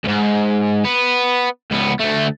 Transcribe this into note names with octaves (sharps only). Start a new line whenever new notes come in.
C#2 G#2
B3
C#2 B3
D2 A3